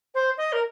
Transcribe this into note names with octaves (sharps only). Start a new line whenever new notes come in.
C5
D#5
A#4